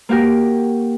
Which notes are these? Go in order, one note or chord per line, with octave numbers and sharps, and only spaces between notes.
A#3 F#4 G4 A#4